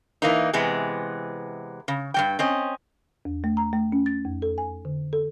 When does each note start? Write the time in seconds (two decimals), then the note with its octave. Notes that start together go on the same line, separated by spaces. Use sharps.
0.22 E3 A#3 D#4
0.53 C3 E3 G#3 B3
1.88 C#3
2.14 G2 G3 G5
2.39 C4 C#4 D#5
3.25 E2
3.44 A3
3.57 A#5
3.73 A3
3.92 C#4
4.06 A6
4.25 F2
4.42 A4
4.58 G#5
4.85 D3
5.13 A4